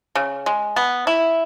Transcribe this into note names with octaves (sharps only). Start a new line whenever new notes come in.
C#3
G#3
B3
E4